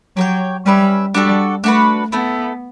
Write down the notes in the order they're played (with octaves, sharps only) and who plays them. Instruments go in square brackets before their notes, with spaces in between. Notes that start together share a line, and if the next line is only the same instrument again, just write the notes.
[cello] F#3 [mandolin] G4 C#5 G5
[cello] G3 [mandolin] C#4 G4 B4 E5
[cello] G3 [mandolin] D4 F#4 A4
[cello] A3 [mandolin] D4 F#4 B4
[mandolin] A3 E4 A4 [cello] B3